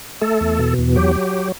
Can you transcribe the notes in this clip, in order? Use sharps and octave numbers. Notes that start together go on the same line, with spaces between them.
A3 A4
E2
B2
E2
F#3 G4
F#3